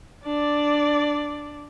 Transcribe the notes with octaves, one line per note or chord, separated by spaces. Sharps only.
D4 D5